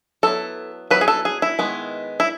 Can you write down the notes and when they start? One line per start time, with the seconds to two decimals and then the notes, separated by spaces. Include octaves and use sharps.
0.23 F#3 B3 E4 A4
0.91 F#3 B3 E4 B4
1.01 G#4
1.08 A4
1.25 G#4
1.42 E4
1.59 D#3 G#3 B3
2.20 E4